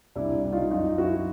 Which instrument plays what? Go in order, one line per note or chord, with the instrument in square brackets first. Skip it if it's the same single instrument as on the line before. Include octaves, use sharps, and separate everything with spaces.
[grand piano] C2 D4 E4
C2
D#4 F4
F#2 D#4 F4
F#2 E4 F#4